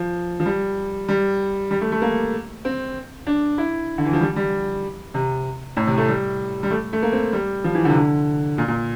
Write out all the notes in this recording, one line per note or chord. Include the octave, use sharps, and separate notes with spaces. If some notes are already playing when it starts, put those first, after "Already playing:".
Already playing: F3
F3
G3
G3
G3
A3
A3
A#3
C4
D4
E4
D3
E3
F3
G3
G3
C3
A2
C3
A3
G3
G3
A3
A3
A#3
C4
G3
F3
E3
D3
C3
D3
A#2
A#2